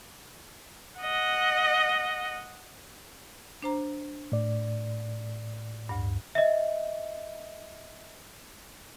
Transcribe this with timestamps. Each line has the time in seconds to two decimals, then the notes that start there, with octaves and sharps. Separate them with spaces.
0.99 D#5 F#5
3.62 D4 C5 A#5
4.32 A2 D5
5.89 D2 G2
6.35 D#5 E5